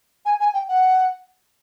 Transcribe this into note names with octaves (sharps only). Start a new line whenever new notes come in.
G#5
G#5
G5
F#5